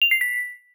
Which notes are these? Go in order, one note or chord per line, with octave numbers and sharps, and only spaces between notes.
F7
C7
B6